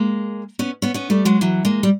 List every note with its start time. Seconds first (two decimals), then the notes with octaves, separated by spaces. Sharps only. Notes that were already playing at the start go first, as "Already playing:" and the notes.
Already playing: G#3 A#3
0.59 B3 C#4
0.82 B3 C#4
0.94 B3 C#4
1.10 G3 A3
1.25 F#3 G#3
1.41 E3 F#3
1.65 G#3 A#3
1.83 G3